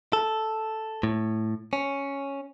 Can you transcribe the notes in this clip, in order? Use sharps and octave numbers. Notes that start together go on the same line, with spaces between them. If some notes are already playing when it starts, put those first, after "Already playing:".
A4
A2
C#4